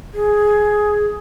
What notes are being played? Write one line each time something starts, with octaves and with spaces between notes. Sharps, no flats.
G#4